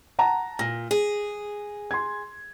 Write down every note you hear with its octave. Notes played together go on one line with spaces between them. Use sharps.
F#5 A5 A#5
A#2 A#6
G#4
C6 G#6